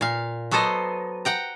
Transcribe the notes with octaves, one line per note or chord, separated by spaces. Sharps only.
A#2 F5
F#3 B3 A4 C5 D#5
F#5 G5 A#5